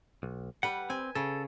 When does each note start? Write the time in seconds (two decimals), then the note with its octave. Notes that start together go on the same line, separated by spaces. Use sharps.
0.23 B1
0.63 G3 B4 F#5
0.90 C4 G#5
1.15 C#3 A4